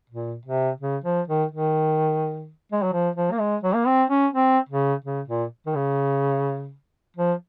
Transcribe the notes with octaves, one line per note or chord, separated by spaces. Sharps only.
A#2
C3
C#3
F3
D#3
D#3
G#3
F#3
F3
F3
A#3
G#3
F#3
A#3
C4
C#4
C4
C#3
C#3
A#2
D#3
C#3
F3